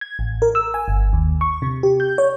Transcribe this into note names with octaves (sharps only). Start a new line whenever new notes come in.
G#6
A1
A#4
E6
G#5
G1
D#2
C#6
C3
G4
G6
C#5